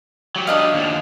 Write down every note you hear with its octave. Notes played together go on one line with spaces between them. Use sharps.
F#3 G4
D4 D#5 F5
D#2 F3